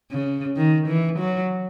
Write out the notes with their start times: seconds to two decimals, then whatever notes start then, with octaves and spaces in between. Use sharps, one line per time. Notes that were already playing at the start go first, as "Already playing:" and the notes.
0.11 C#3
0.56 D#3
0.87 E3
1.19 F#3